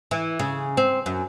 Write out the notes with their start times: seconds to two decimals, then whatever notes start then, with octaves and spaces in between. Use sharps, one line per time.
0.11 E3
0.39 C#3
0.77 C4
1.06 F#2